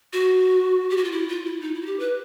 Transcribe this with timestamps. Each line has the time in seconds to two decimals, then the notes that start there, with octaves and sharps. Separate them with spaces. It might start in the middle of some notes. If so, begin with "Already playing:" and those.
0.13 F#4
0.90 G4
0.97 F#4
1.04 F4
1.12 E4
1.29 F4
1.45 E4
1.61 D#4
1.74 E4
1.82 F#4
1.86 G4
1.99 B4